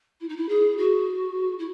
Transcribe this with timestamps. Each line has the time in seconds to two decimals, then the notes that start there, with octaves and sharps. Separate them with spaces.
0.20 E4
0.29 D#4
0.37 E4
0.49 G#4
0.78 F#4
1.59 E4